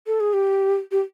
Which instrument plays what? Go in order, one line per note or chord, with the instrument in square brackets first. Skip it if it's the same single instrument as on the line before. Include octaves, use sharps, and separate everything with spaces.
[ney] A4
G#4
G4
G4